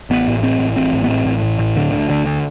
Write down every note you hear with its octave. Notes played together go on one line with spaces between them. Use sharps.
A1 B3
A2
A1 C4
A2
A1 C4
A2
B3
A1 C4
A2
A1
A2
D2 D3
D3
D2 D3
D3